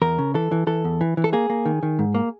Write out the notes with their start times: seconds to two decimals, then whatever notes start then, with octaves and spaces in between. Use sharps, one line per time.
0.02 E2 A#4
0.18 C#3
0.34 E3 A4
0.52 E3
0.67 E3 A4
0.84 E2
1.01 E3
1.17 E3
1.24 A4
1.33 A#3 G#4
1.50 A#3
1.66 D#3
1.83 D#3
1.99 G#2
2.15 A#3